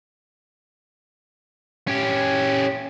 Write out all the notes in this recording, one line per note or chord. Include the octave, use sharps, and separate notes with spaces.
C#4 G4